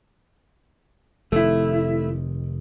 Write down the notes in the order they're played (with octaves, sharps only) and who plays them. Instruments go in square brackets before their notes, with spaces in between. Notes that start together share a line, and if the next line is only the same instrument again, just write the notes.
[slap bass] F1 C3 D#3 [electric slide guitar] A3 E4